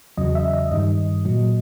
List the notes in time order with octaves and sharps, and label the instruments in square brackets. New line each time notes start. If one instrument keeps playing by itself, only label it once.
[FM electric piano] E2 C#3 F#3 D#5
E5
D#5
G2 D#3 G3 D#5
A#2 F#3